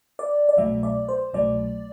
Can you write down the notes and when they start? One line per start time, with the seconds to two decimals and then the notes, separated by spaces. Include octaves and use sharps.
0.19 D5
0.49 D5
0.57 C2 B2 F#3 A3 E5
0.83 D5
1.09 C5
1.34 C2 B2 F#3 A3 D5